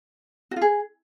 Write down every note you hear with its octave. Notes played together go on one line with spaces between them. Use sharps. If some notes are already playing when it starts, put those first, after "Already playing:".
F#4
F4
G#4